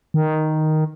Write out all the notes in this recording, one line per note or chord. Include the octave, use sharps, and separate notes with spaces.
D#3